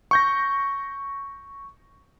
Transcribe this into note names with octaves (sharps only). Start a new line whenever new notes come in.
C#6 G6 A#6